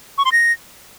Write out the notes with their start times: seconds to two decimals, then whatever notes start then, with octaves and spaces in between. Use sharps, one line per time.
0.18 C#6
0.25 C6
0.32 A#6